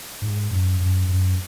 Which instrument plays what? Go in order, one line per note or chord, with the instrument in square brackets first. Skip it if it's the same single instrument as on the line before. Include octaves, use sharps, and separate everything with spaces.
[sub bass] G#2
F#2
F#2
F#2